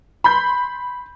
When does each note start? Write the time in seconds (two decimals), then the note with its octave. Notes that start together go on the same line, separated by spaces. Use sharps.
0.24 B5 C6 G6